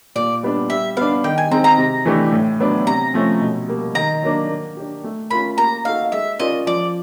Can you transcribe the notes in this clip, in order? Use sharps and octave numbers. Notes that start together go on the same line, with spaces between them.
A#2 D5
G3 B3 D4
G3 E5
B3 D4 F5
D#3 G5
G#5
G#3 C4 D#4 A#5
A#5
C3
E3 A3 D4 G4
A2
F#3 B3 D4
C3 A#5
F3 A3 C#4
B2
G3 A#3
D#3 A#5
F#3 A#3 D4
A#3
D4 G4
A3
C#4 F4 A#4 B5
A#3 A#5
D#4 F#4 A4 F5
G#3 E5
C#4 F4 A#4 D5 D#5
F3 D5